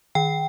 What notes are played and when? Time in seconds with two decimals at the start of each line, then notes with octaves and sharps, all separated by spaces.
0.15 D#3 G5